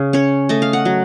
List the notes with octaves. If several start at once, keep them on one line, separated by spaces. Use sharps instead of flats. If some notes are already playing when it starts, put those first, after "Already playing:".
Already playing: C#3
C#4 C#5
A3 D#5
F5
F#5
F#3